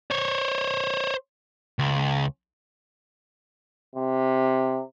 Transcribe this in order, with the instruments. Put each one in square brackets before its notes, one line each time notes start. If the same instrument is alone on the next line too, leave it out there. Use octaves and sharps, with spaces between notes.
[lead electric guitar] C5 C#5
C#2
[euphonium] C3